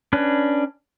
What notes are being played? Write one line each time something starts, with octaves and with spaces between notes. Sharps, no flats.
C#4 D4 B4